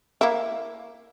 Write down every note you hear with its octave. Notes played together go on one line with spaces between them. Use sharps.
A#3 E4